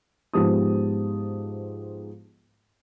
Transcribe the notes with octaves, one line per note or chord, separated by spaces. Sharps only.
G#2 F3 B3 G4 A5 D#6